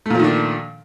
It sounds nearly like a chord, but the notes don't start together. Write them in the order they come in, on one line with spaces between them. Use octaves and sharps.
A3 A#2 F3 D#3 D4